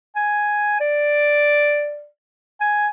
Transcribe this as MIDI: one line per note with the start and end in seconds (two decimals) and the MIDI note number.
0.16 0.79 80
0.81 2.06 74
2.61 2.88 80